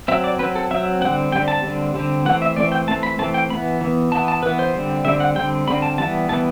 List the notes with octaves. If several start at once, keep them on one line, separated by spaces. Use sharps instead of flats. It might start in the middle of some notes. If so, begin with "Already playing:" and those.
F#3 C4 E5
D5
F#3 C4 B4
A4
F#3 C4 E5
D3 G3 C4 F#5
D3 G3 C4 G5
A5
D3 G3 C4
D3 G3 C4
E3 A3 C4 F#5
E5
E3 A3 C4 D5
G5
E3 A3 C4 A5
B5
E3 A3 C4 A5
G5
E3 B3 B5
E3 B3
E3 B3 A5
A5
E3 B3 B4
C5
D3 G3 C4
D3 G3 C4 E5
F#5
D3 G3 C4 G5
D3 G3 C4 B5
A5
E3 G3 B3 A5
E3 G3 B3 A5